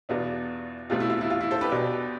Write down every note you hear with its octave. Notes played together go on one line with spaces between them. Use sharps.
E2 B2 B3 D4 F4
E2 B2 A3 C4 F4
E4
F4
E4
F4
E4
A4 C5
G4 B4
B1 B2 B3 D4